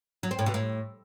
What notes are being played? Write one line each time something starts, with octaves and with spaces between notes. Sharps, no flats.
F#3
C4
A2
B2
A2